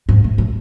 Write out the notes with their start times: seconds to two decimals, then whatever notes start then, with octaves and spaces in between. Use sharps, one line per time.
0.09 G#2
0.24 A2
0.38 A2